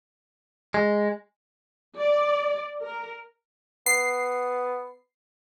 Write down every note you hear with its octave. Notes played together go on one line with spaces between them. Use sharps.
G#3
D5
A#4
B3 C7